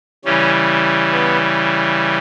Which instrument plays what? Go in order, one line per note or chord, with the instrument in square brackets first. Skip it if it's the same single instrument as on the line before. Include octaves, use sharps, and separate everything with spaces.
[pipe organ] C#3 E3 G3 C#4
B3